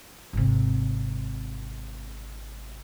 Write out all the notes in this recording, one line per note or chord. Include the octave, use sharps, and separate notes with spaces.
G#1 C3